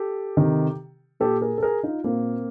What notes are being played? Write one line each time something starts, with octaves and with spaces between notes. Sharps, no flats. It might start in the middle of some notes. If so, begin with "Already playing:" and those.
Already playing: G4 A4
C3 D#3
A#2 G4 A4
G#4 A#4
A4
G#4 A#4
D#4 F4
A#2 A#3 C4